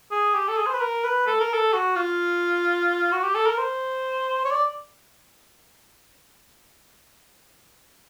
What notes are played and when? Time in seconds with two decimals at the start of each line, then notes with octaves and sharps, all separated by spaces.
0.11 G#4
0.35 G4
0.48 A4
0.58 G#4
0.66 C5
0.74 B4
0.80 A#4
1.04 B4
1.27 A4
1.40 A#4
1.54 A4
1.73 F#4
1.96 F4
3.12 F#4
3.23 G4
3.35 A4
3.47 A#4
3.58 C5
4.45 C#5
4.51 D5